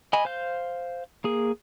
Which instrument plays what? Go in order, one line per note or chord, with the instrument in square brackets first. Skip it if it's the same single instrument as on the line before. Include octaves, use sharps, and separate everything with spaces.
[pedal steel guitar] D#5 G#5 B5
C5 F5 G6
A#3 G#4